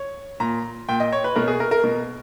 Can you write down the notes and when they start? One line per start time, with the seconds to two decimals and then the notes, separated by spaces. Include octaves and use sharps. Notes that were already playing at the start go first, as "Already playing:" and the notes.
Already playing: C#5
0.40 A#2 A#5
0.89 A#2 G5
1.00 D#5
1.12 C#5
1.24 B4
1.36 B2 A#4
1.48 G#4
1.60 A#4
1.71 A#4
1.84 B2